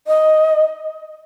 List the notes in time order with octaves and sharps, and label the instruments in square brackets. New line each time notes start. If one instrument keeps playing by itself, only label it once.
[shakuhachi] D#5